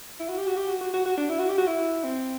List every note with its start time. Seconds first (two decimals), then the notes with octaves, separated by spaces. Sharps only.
0.20 E4
0.29 F#4
0.38 G4
0.47 F#4
0.56 G4
0.68 F#4
0.81 F#4
0.93 F#4
1.05 F#4
1.17 D4
1.30 E4
1.39 F#4
1.49 G4
1.58 F#4
1.67 E4
2.04 C4